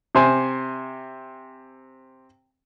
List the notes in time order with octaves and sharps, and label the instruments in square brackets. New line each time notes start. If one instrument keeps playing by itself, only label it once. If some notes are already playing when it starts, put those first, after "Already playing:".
[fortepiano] C3 C5 G#5